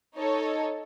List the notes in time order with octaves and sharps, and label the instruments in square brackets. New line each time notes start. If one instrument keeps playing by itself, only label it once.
[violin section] D#4 A4 C#5